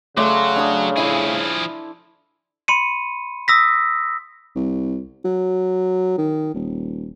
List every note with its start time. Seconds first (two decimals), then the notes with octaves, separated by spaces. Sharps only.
0.17 C#3 F#3 A3 A4 E5 C6
0.56 D4 D6 D#6
0.97 F3 E4 G#4 E5
2.68 B5 C6 C#7 D#7
3.48 D#6 E6 A#6 B6
4.55 C2
5.25 F#3
6.18 D#3
6.54 D#1